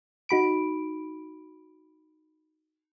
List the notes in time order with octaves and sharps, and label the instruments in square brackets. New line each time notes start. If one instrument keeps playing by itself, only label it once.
[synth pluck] D#4 F#4 B5 D7